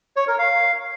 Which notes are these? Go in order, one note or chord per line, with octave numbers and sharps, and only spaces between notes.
C#5
A#4
F5